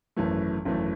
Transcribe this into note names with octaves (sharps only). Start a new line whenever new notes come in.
G#1 F#2 E3 A3
G#1 F#2 E3 A3